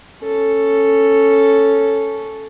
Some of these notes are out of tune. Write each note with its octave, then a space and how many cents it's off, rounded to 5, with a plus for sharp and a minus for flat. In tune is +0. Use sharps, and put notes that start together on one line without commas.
C#4 +0 A4 +0